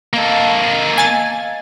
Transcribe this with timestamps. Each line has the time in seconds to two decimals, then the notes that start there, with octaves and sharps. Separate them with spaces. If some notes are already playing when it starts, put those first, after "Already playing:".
0.14 A#3 A4 D#5 F5
0.98 G#5 A6